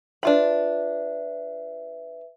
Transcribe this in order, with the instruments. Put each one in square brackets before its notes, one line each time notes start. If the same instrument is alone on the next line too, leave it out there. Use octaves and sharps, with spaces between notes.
[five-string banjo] D4 F4 B5 [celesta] B4 E5